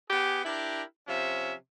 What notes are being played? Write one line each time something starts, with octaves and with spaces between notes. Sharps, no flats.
B3 G4 G#4
D4 E4 G4 A#4
C3 F3 C#4 E5